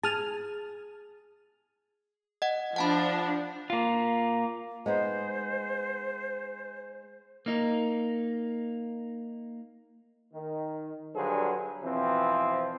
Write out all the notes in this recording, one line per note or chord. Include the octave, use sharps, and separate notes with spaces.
G#4 A5 D#6 F6
D#5 F#5
F3 D4 F#5 A5 B5
A#3 F4
G#3 B3 D#4 C5
A#3 D#4
D#3
G2 D3 F#3 G#4 C5
B2 E3 F3 C4